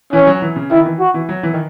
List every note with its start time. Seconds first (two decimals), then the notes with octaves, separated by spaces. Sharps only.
0.13 E3 C#4
0.27 F#3
0.42 E3
0.56 C#3
0.71 D#3 E4
0.85 E3
1.00 F#4
1.14 E3
1.29 F#3
1.43 E3
1.53 D#3